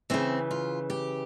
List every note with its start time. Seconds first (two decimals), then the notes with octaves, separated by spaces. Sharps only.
0.10 C#3 E3 C4
0.51 F4
0.90 G4